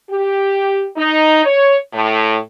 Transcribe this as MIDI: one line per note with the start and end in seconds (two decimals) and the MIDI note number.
0.10 0.86 67
0.97 1.45 63
1.45 1.76 73
1.93 2.37 45